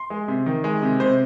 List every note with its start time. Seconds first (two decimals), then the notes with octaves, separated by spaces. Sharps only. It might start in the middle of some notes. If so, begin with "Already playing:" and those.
Already playing: C6
0.10 G#3
0.28 C3
0.46 D#3
0.64 G#3
0.82 C3
1.00 C3 C5